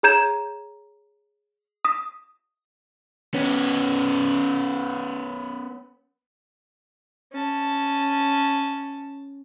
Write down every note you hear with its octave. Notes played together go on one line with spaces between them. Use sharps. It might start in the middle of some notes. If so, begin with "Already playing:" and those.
G#4 C#5 A#5 G6 G#6 E7
D#6
B3 C#4
C#4 A5